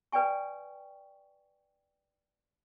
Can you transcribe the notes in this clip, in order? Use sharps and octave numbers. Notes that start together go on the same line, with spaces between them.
B4 D5 G5 G#5 C#6